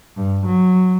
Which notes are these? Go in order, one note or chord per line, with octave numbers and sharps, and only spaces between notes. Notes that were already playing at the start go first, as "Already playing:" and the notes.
G2
F#3